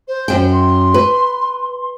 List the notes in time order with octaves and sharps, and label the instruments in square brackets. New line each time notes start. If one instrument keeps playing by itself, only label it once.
[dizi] C5
[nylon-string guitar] F#2 G5
[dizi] C6
[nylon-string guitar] B4